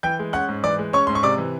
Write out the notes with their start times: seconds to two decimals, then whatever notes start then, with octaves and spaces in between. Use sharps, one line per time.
0.03 E3 G5 G6
0.19 G#3
0.33 C#4 F#5 F#6
0.48 G#2
0.64 E3 D5 D6
0.79 G#3
0.93 C#4 C#5 C#6
1.07 G#2 C6
1.15 C#6
1.23 C3 D5 D6
1.38 E3